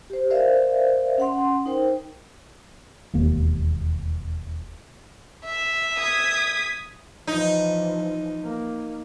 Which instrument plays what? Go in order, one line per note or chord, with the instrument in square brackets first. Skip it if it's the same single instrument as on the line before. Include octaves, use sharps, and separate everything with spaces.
[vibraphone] G4 C5
A#4 C5 D5 E5 F5
C#4 F#5 C6
D#4 A#4 C5 G5
[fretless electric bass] E1 D#2 A#3
[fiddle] E5
[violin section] D#6 G#6 B6
[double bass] E3 F3 [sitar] D#4
[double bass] A#3